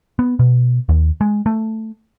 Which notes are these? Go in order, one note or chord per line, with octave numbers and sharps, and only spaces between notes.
B3
B2
D#2
G#3
A3